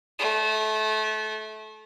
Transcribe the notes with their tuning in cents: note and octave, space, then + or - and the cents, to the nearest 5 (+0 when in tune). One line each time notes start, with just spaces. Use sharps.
A3 -25